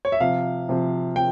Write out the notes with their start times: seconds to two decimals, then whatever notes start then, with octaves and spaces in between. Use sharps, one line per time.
0.05 C#5
0.12 E5
0.20 C3 F3 F5
0.69 C3 F3
1.16 C3 F3 G5